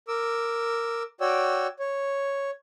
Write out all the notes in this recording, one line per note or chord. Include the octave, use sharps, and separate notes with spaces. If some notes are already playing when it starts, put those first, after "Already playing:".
A#4 D6 E6
F#4 C#5 D5 G5 E6
C#5